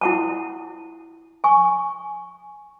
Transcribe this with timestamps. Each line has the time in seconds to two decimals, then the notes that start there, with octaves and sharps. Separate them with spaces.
0.01 E4 F#5 A5
1.44 G#5 C#6